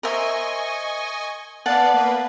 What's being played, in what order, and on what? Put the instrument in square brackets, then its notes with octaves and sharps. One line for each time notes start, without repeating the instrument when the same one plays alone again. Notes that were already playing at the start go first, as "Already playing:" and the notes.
[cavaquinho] A#4 C5 E5 [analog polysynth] D#5 G#5 C#6
[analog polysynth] B3 D5 F5 [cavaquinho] F#5 A5
[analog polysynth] A#3 B4